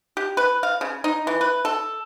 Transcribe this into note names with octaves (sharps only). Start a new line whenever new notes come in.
G4
B4
F5
C#3
D#4
E3
B4
A4